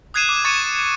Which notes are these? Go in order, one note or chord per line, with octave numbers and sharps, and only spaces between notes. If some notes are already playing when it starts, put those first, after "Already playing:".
D#6 F#6 G#6 C7 D#7 E7
D6
C#6 A6 C#7 D#7 E7